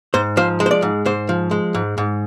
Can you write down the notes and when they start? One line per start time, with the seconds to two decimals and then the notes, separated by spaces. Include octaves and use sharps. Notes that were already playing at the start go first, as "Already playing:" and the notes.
0.14 G#2 C5
0.37 F3 C5
0.60 G#3
0.66 C5
0.71 D5
0.82 G#2
1.05 G#2 C5
1.29 F3
1.51 G#3
1.75 G#2
1.98 G#2